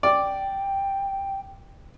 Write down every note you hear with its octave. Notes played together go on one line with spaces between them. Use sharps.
D5 G5